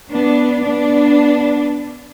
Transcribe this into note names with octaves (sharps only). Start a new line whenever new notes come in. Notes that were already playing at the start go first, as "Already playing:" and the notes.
B3 D4
B3 D4